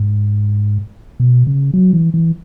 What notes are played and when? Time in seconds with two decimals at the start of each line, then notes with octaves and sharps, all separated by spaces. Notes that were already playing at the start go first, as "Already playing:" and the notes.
Already playing: G#2
1.20 B2
1.47 C#3
1.74 F#3
1.93 E3
2.14 E3